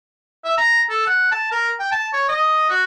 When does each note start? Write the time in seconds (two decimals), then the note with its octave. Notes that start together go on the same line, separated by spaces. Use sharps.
0.45 E5
0.58 A#5
0.90 A4
1.07 F#5
1.32 A5
1.52 A#4
1.80 G5
1.92 A5
2.13 C#5
2.29 D#5
2.70 F#4